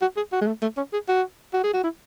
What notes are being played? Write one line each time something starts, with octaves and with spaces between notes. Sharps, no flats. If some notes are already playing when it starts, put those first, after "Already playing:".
F#4
G#4
F#4
G#3
A3
A3
C#4
G#4
F#4
F#4
G#4
F#4
E4